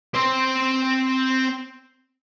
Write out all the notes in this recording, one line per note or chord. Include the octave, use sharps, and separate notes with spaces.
C4 C5